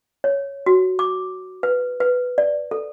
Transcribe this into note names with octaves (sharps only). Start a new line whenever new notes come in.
C#5
F#4
D6
B4
B4
D5
A4